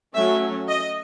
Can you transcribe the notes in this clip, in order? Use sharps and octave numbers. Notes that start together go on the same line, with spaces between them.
F#3 A3 C#4 E5
D#5